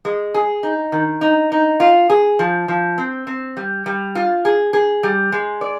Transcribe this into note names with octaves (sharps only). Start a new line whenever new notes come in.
G#3
G#4
D#4
D#3
D#4
D#4
F4
G#4
F3
F3
C4
C4
G3
G3
F4
G#4
G#4
G3
G#3
D5